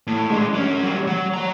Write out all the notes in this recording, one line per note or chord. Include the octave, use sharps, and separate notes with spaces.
A2
G#3 D4
F#3 C#4
F#3 G3
F#3
C#5 A#5